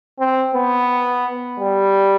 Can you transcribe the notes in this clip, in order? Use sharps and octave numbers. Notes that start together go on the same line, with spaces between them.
C4
B3
G3